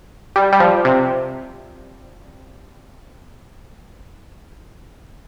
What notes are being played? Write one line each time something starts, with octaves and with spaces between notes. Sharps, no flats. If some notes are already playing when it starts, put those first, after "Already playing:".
G3
G3
F3
C3